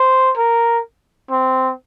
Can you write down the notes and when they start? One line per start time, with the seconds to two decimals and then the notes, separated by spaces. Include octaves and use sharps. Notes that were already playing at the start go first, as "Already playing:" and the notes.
Already playing: C5
0.37 A#4
1.30 C4